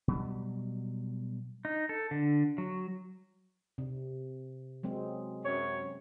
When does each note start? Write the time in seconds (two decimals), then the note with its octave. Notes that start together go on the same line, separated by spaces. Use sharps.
0.08 B2 F#3 G3
1.65 D#4
1.89 A4
2.11 D3
2.58 F#3
3.78 C3
4.83 F#3 G#3 C4
5.44 F#2 C#5